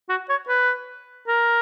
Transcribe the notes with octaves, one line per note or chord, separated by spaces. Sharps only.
F#4
C#5
B4
A#4